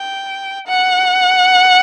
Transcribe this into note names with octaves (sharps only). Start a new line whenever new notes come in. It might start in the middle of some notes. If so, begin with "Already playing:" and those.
Already playing: G5
F#5